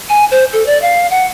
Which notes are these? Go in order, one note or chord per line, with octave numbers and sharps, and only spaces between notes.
G#5
C5
A4
D5
F5
F#5